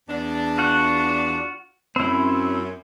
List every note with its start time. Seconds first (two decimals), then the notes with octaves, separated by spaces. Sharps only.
0.09 E2 D4
0.58 F4 F#4 F#5
1.96 F#2 C4 E4